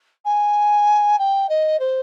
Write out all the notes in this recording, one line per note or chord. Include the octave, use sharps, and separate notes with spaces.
G#5
G5
D#5
C5